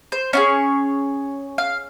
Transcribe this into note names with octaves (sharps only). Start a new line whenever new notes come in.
C5
C#4 F4 G#4 C#5
F5